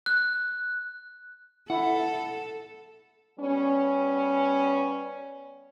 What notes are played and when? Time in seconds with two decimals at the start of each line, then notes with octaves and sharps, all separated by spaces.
0.06 F#6
1.70 E4 A4 F#5
3.40 G3 B3 C#4